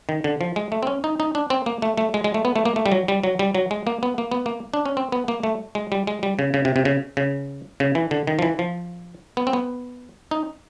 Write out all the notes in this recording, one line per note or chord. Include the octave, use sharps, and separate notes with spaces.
D#3
D3
F3
G#3
A3
C4
C#4
D#4
D#4
D4
C4
A#3
A3
A3
G#3
G#3
A3
B3
A3
A#3
A3
G3
F#3
G3
F#3
G3
F#3
G#3
A#3
B3
A#3
B3
A#3
D4
C#4
C4
B3
A#3
A3
G#3
G3
G#3
G3
C#3
C#3
C3
C3
C#3
C#3
C#3
E3
D3
D#3
F3
E3
F3
B3
C4
B3
D#4